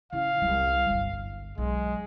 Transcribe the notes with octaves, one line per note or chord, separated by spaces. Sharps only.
C#3 E4 F5
C2 G3
G1
B1 G#3